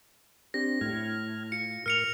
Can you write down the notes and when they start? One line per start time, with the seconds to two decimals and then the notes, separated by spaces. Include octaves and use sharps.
0.54 C4 D4 G4 A#6
0.81 A2 F6 G#6
1.52 F4 C#7
1.86 A2 A#4 F6 C#7 F7